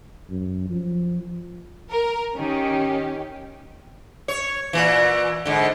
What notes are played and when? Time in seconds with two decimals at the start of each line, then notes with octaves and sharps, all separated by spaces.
0.30 F#2
0.69 F3
1.89 A#4
2.36 D#3 C#4 G4
4.28 C#5
4.73 A#2 E3
5.45 G#2 D3